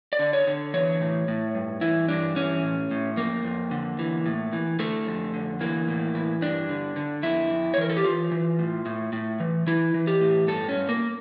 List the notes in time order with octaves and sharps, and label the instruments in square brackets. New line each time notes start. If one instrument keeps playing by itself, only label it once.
[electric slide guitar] D5
D3
C#5
D3
E3 C#5
A2
A2
G2
E3 E4
G2 D4
E3 C#4
A2
A2
F2 A#3
F2
D3
E3
A2
E3
D3 A3
F2
D3
E3 A#3
A2
E3
G2 D4
D3
D3
F2 E4
F2
C#5
E3 A#4
A4
G4
E3 F4
E3
A2
A2
A2
E3
E3 E4
E3
G4
A2
G2 A4
C#4
G2
A#3